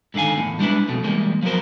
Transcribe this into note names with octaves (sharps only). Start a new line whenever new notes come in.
G#2 D3 D#3 F5 G#5
E2 A2
G3 G#3 D4 E4 B4
F2 B2 A3
E3 G3 G#3 A#3
F3 F#3 B3 A#4 C5